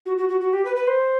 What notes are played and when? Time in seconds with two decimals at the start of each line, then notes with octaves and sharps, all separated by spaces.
0.06 F#4
0.18 F#4
0.29 F#4
0.41 F#4
0.53 G4
0.65 B4
0.76 B4
0.87 C5